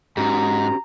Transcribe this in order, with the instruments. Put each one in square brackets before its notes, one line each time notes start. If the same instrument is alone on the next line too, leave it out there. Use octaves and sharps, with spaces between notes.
[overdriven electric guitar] G#2 [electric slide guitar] C#4 F#4 G4 [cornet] A#5